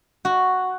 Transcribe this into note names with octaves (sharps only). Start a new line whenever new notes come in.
F#4